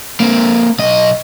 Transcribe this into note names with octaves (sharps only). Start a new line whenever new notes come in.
A#3 C4
B1 D#5